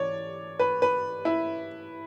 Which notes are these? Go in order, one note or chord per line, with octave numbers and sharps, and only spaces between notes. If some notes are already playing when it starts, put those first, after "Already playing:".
Already playing: E3 C#5 D5
B4
B4
E4